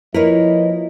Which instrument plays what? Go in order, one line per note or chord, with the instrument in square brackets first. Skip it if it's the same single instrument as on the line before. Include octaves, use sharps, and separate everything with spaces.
[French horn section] F3 D#5 [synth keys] A#3 E4 [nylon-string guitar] A#4 B4 C#5